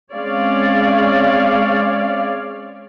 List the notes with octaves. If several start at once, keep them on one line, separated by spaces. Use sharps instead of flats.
G#3 C4 C#4 C#5 D5 F5